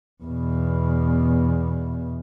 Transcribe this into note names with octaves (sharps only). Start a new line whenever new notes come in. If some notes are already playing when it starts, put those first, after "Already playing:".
E2 B2